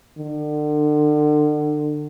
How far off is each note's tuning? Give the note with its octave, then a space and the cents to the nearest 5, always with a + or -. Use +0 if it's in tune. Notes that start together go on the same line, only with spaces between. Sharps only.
D3 +35